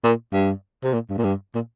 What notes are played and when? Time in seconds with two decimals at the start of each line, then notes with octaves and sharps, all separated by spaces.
0.03 A#2
0.32 G2
0.83 C3
0.93 A#2
1.09 G2
1.18 A#2
1.24 G2
1.55 A#2